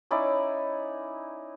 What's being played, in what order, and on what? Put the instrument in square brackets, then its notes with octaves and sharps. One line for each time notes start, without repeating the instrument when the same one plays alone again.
[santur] C#4 D#4 E4 D5